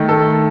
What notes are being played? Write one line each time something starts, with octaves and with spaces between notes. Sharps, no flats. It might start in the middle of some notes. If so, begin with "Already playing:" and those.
Already playing: D#3 A3
A4